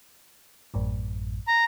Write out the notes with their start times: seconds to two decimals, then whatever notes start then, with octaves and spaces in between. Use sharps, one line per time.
0.74 A1 F#2 A2
1.48 A#5